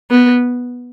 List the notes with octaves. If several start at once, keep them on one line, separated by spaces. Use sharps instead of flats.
B3